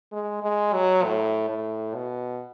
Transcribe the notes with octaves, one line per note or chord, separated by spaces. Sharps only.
G#3
G#3
F#3
A2
A2
B2